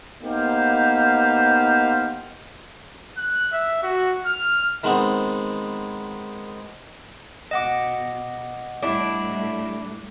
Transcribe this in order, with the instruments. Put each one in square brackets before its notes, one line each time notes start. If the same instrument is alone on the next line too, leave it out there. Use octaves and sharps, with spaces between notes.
[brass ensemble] A#3 B3 D#4 G4 C5 F5
[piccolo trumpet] F#6
E5
F#4
F6
[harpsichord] D#3 G#3 B3 C4
[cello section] B2 [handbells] D#5 F#5 D6
[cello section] A2 G3 [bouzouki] D4 E4